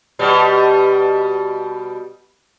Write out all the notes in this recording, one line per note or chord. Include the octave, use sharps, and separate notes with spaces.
B2 G3